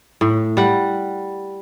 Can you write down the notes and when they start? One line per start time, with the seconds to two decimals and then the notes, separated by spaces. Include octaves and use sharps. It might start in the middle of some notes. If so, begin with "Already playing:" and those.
0.21 A2
0.57 G3 F#5